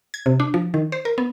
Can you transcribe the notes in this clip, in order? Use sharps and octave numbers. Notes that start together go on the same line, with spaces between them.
G#6
C3
D4
F3
D#3
C5
A#4
B3